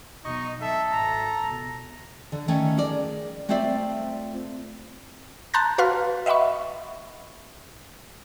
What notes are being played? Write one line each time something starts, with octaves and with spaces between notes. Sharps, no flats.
B2 F#3 D#4 D#5 C#6
G1 D3 A4 E5
G#1 A#5
C#2 B2
D3
D#3 A3 C#4 G5
G#4 A#4 D5
A3 C4 F4 C5 D5 E5
A5 A#5 C6 F#6 G6 A6
F#4 B4 F5 C6 F6
D#5 E5 F#5 B5 C#6